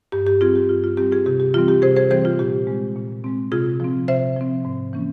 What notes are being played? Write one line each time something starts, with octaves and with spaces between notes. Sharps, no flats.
G2 G4
G4
G3 C4 F4 G#4
G4
G2 F4
F4
G3 C4 G4
F4 G#4
C3 G4
G4
E3 G3 C4 F4
G4
C3 G#4 C5
G#4 C5
E3 G3 C4 G#4 C5
F4
A#2 G4
G#3 C4
A#2
G#3 C4
C3 F4 G#4
F3 C4
C3 C5 E5
F3 C4
G#2
E3 A#3 C#4